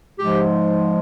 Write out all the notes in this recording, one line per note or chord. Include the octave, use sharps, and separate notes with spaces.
G#2 F3 G#3 G4